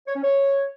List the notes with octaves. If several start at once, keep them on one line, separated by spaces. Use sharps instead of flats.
C#5
C#4
C#5